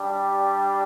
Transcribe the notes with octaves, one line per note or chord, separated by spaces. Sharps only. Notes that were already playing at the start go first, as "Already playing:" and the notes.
Already playing: G3 D4 G4